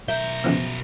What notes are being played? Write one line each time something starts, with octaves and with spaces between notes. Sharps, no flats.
B1 A#4 E5 G6
C#2 B2 E3 F3